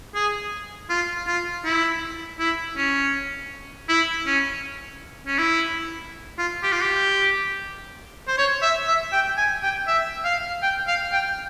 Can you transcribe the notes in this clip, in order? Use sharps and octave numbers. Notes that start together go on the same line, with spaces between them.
G#4
F4
F4
E4
E4
C#4
E4
C#4
C#4
E4
F4
G4
F4
G4
C5
C#5
E5
E5
G5
G#5
G5
E5
F5
G5
F5
G5